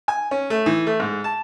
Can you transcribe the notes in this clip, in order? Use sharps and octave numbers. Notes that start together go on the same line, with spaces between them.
G#5
C#4
A3
E3
A3
G#2
A5